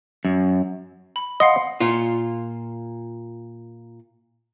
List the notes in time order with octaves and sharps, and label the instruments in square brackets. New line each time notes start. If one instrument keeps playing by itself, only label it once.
[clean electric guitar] F#2
[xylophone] B5
[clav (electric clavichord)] D#5 [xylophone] F5 F#5 C6
[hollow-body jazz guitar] A#2 F4